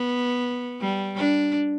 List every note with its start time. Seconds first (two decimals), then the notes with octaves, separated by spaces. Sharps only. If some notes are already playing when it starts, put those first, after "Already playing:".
Already playing: B3
0.81 G3
1.17 D4